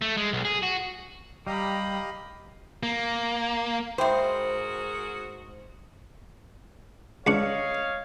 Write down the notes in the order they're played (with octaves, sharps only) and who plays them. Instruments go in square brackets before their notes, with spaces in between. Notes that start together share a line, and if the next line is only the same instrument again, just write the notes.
[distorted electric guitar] A3
G#3
B1
G#4
F#4
[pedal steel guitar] G3 [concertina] G4 D#5 F5 [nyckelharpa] A#5 B5
[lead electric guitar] A#3
[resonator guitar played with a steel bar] G#2 C5 [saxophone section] F#4 G#4 A#4 [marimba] E5 G5 B5
[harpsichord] C#2 D4 C#6 [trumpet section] C#5 D#5 F5